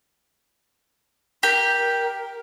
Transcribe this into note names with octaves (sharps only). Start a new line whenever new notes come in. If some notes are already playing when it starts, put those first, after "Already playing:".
G4 A#4